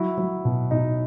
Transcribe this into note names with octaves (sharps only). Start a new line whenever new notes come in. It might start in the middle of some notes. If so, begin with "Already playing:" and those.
Already playing: F#3 E4
F#3
B2
B2 D#4